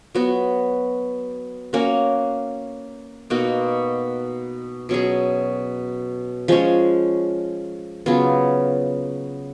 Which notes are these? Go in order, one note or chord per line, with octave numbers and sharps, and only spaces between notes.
F#3 B3 F#4
A#3 C#4 F#4
B2 A#3 D#4 F#4
B2 F#3 C#4 G#4
F3 G#3 C#4
C#3 F#3 B3 F4